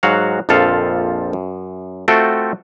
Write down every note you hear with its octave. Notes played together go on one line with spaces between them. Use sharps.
G#2 F#3 F#4 F5 F#5
A#1 F2 F3 F4 A4 F5
F#2
A3 C4 F4 F#4 A4 G5